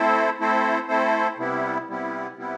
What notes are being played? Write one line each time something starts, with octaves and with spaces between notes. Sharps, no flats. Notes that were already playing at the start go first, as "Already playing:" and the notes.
Already playing: A3 C4 E4 A4 C5
A3 C4 E4 A4 C5
A3 C4 E4 A4 C5
C3 G3 B3 E4
C3 G3 B3 E4
C3 G3 B3 E4